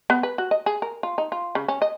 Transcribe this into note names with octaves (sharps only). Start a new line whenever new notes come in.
B3
B4
F#4
D#5
G#4
A#4
F4
D#4
F4
C#3
C#4
D#5